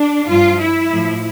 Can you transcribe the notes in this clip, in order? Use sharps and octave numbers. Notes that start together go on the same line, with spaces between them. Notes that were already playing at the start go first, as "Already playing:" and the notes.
Already playing: D4
G2 F3 F4
E4
A2 F3